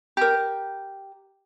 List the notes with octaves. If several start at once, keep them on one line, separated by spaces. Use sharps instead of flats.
G4 A#4